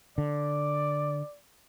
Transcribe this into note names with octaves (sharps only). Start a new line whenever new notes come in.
D3 D5